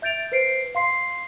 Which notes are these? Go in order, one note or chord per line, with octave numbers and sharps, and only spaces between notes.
E5 G6 A6 D7 F7
B4 C5 C7 D7
F5 C6 C7